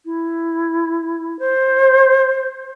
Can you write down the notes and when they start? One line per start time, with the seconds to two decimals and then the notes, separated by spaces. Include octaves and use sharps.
0.05 E4
1.39 C5